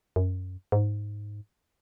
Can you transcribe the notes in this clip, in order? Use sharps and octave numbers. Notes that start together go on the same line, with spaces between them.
F#2
G#2